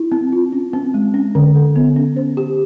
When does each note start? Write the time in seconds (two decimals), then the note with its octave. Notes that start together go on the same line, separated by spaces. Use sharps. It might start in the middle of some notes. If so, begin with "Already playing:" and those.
Already playing: E4
0.12 C4
0.32 F4
0.52 C#4
0.73 C4
0.94 G#3
1.14 C#4
1.35 D3
1.55 A4
1.76 B3
1.96 C#4
2.16 C5
2.37 G4